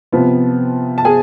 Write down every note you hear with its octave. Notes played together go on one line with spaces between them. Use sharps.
C3 F3 B3
A5
G#4 G#5